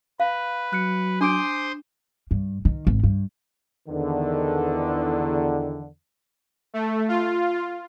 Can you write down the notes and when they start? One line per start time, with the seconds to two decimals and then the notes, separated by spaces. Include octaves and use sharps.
0.20 B4 F5
0.73 F#3 F#6 C#7
1.21 D4 C5 G#5 C6 D6 D#6 D7
2.31 G2
2.65 D#3
2.87 G#1
3.03 G2
3.88 E2 D3 D#3
6.74 A3
7.08 F4